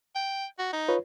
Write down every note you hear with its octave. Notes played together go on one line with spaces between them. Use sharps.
G5
F#4
D#4
F4 B4 C#5